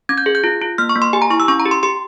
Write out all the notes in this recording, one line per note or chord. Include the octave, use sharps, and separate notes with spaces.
C#4 G#6
G6
G#4
G6
F4
F4
A#3 F6
C#6
A#3
C6
G4 G#5
A#5
E4 C#6
E6
C#4 C#6
A#5
G4
C6
G4 C6